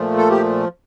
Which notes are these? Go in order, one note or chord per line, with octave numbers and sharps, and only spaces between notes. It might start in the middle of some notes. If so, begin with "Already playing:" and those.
Already playing: A#2 F3 A3
A4
G4